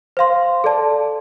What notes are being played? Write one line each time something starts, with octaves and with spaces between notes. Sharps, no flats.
C5 F5 C6
A4 D5 A5